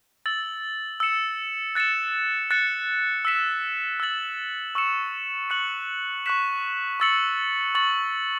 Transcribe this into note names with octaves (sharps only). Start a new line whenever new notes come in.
E6 A6 F#7
E6 C#7 E7
F#6 A6 C#7 E7
F#6 A6 C#7
E6 B6 E7
E6 A6 F#7
C#6 E6 C#7 E7
C#6 F#6 C#7 F#7
C#6 F#6 B6 E7
C#6 E6 A6 C#7 F#7
C#6 A6 F#7